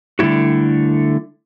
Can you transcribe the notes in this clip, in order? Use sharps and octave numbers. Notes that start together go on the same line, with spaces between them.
D3 G3 A3 E4 F#4